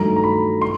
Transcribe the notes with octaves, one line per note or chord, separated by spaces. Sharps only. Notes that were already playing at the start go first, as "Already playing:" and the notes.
Already playing: G2 D#3 F#3 A3 A#5
A#5
B5
C6